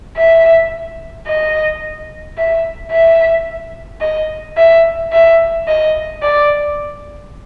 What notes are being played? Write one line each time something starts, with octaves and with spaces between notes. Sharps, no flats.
E5
D#5
E5
E5
D#5
E5
E5
D#5
D5